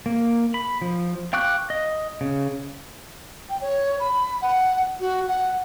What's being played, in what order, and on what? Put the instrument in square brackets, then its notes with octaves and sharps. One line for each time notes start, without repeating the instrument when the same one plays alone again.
[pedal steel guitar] A#3
B5
F3
F5 G5 C#6 D6 F#6
D#5
C#3
[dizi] G5
C#5
B5
F#5
F#4
F#5